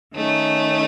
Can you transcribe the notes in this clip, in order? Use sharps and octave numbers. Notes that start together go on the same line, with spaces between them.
D#3 A3 C#4